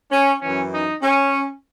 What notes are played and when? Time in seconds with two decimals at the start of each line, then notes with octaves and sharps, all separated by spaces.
0.11 C#4
0.41 F#2 E3 C#4
0.72 D#4
1.02 C#4